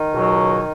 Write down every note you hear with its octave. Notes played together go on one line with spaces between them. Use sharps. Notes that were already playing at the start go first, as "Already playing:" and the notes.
Already playing: D#3
C#2 B2 F#3